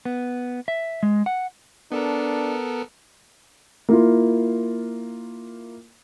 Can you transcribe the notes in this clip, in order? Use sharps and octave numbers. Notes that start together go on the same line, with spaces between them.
B3
E5
G#3
F#5
B3 D4 A4 A#4
A#3 E4 F4